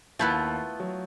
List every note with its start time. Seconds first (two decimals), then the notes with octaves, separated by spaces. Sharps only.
0.19 D#2 A3 B3 E4 F4 A5 G6 F#7
0.80 F#3